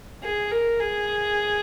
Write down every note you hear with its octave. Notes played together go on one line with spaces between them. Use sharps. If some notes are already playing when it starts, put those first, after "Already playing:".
G#4
A#4
G#4